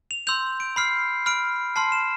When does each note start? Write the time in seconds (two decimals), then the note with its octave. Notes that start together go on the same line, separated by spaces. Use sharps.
0.11 F7
0.27 C6 E6 G6 F7
0.60 D7
0.76 B5 F6 C7
1.26 B5 F6 D7
1.76 A5 C6 F6 C7
1.92 E7